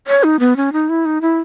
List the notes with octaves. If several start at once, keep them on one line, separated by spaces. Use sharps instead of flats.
C#5
D#4
B3
C#4
D#4
E4
D#4
E4